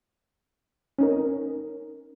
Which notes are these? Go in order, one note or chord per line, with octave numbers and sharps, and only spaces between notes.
C#4 D#4 A#4